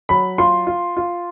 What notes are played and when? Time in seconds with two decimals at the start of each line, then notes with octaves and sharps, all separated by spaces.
0.09 F#3 B5
0.38 F4 C6
0.67 F4
0.97 F4